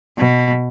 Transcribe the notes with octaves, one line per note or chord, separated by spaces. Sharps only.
B2